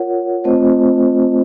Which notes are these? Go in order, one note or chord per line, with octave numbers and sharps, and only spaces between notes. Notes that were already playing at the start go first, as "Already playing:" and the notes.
Already playing: F4 A#4 C#5 F#5
A3 C4 F4 C5 D#5